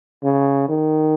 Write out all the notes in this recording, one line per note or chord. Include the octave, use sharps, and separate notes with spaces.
C#3
D#3